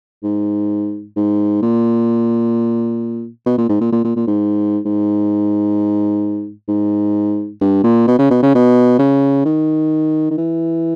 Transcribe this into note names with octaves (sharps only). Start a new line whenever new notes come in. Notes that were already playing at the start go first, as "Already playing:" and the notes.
G#2
G#2
A#2
B2
A#2
G#2
A#2
A#2
A#2
A#2
G#2
G#2
G#2
G2
A#2
B2
C#3
B2
C#3
B2
C#3
D#3
D#3
E3